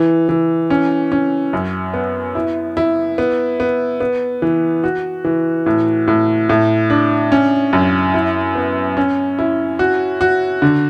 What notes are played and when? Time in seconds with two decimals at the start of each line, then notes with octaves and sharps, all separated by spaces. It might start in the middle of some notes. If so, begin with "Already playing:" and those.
Already playing: E3
0.29 E3
0.70 C#4
1.12 C#4
1.53 F#2
1.94 B3
2.35 E4
2.77 E4
3.18 B3
3.60 B3
4.00 B3
4.42 E3
4.84 F#4
5.24 E3
5.66 A2
6.08 A2
6.49 A2
6.90 D4
7.32 C#4
7.73 F#2
8.14 E4
8.55 B3
8.97 C#4
9.39 E4
9.79 F#4
10.21 F#4
10.62 D3